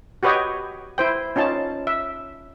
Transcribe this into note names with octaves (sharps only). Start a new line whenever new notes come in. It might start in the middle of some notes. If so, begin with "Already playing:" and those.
F#4 G4 B4 C#5 D#5 G5
E4 C5 G5
C#4 D#4 F4 A5
E5